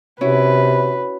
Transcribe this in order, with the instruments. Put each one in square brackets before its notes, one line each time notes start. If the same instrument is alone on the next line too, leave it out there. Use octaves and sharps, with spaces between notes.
[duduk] C3 [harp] C#4 E4 F#4 [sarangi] B4